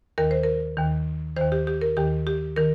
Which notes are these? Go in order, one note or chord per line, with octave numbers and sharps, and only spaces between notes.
D#2 D#3 A#4
C5
A#4
D#2 D#3
D#2 D#3 C5
G4
G4
A#4
D#2 D#3 G4
G4
D#3 A#4